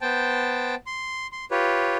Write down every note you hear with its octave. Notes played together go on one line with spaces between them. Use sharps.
B3 C5 G5 A5
C6
C6
F4 G4 B4 C#5